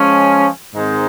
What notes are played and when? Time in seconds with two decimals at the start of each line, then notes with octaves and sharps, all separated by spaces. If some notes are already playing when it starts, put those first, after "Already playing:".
Already playing: F3 G#3 C#4
0.74 G#2 D#3 G#3 C4 D#4